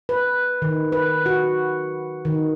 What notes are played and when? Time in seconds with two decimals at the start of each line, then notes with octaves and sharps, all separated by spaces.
0.09 B4
0.62 D#3
0.92 B4
1.26 F#4
2.25 D#3